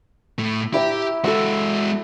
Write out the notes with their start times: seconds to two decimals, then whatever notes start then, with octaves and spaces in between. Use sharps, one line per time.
0.38 A2 A3
0.74 E4 G4 E5 A#5
1.24 G#3 F#4 A4 E6